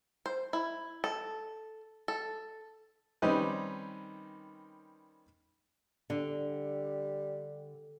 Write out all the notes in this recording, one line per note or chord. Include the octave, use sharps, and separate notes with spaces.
C5
E4
A4
A4
D#3 G3 C4 C#4 D#4 B4
D3 G3